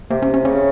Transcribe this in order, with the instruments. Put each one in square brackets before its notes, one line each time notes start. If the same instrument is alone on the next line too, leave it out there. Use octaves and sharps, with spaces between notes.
[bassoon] C3 [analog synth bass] A#3
[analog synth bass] C#4
C#4
[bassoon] C#3 [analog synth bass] C#4